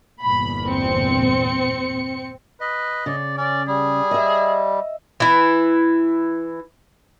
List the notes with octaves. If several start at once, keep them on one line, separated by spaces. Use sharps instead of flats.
G1 E2 A#2 B5
C4 C#7
B4 D#5
C#3 D5
C#4 D5
G3 G#4
D#5 E5
E3 E4